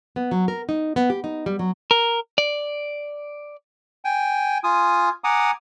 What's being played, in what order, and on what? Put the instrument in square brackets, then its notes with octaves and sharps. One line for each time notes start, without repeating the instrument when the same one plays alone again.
[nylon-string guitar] B3
F#3
A#4
D#4
B3
G4
D#4
G3
F#3
[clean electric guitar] A#4
D5
[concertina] G5 G#5
F4 G#5 D#6
F#5 G#5 A#5 D6 D#6